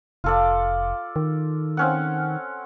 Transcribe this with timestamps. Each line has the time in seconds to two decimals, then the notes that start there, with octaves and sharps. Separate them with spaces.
0.24 F1 F4 A4 D5
1.16 D#3
1.77 C4 C#4 F#5